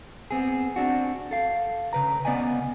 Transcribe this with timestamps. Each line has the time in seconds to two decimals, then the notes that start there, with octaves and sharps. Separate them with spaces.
0.31 B3 C4 G#4
0.76 C4 D4 F#4
1.31 A4 F5
1.93 C#3 B4 A#5
2.25 C#3 B3 D5 D#5 G#5